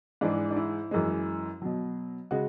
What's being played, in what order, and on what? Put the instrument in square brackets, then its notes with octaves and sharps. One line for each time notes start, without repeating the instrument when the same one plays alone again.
[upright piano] G#2 E3 G#3 D4
D4
E4
F#2 E3 G#3
B2 F#3
C#3 G#3 F#4